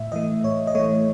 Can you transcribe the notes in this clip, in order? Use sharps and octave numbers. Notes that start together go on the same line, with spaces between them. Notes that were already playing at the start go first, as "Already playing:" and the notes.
Already playing: A2 E5
E3 A3 D#5
A2 C#5
D#5
E3 A3 C#5